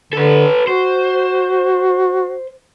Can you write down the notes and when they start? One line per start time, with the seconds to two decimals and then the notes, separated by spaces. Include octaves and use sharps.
0.13 D3 A4 B4
0.67 F#4 C5